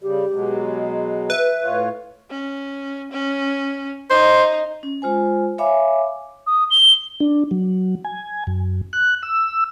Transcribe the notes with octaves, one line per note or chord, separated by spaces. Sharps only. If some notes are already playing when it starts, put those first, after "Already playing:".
C#3 G3 G4
B2 F#3 G#3
B4 E5
A2 F4 C#5
C#4
C#4
D#4 C5
C#4
G#3 F4 C5 G#5
C#5 E5 F5 G#5 B5 D6
D#6
G7
D4
F#3
G#5
F#2
F#6
E6